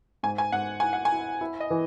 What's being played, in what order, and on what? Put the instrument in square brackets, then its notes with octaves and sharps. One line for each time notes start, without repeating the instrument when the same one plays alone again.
[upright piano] G#2 [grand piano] G#5
[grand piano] G#5
[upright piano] G#2 [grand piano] F#5
[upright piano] E4 [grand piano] G#5
[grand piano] F#5
G#5
[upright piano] E4
E4
[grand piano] D#5
[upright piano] E3